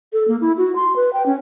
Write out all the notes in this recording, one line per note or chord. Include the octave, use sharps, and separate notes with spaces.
A4
A#3
E4
F#4
C6
B4
G5
C#4